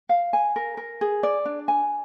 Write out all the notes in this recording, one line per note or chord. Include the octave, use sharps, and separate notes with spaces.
F5
G#5
A#4
A#4
G#4
D5
D4
G#5